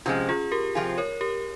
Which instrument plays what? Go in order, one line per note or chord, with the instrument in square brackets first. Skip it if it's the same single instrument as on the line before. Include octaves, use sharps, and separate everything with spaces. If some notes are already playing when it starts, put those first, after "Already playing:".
[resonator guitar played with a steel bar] C3 F3 G#3 [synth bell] C#4 F4
[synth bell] F4 G#4
G4 A#4
[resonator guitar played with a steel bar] C3 F3 C4 F4 G#4
[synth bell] A#4 C#5
G4 A#4